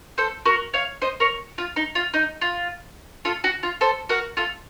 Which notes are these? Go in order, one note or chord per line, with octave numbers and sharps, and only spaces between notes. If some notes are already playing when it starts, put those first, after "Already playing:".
A4 C5
F#4 A#4
C#5 F5
C5 D#5
A#4 C#5
F4
D#4
F4
D#4
F4
F4 A4
F#4
F4
A4 C5
F#4 A#4
F4 A4